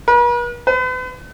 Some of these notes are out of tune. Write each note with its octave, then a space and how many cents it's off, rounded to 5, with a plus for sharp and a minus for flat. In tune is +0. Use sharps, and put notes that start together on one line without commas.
B4 -45
B4 +40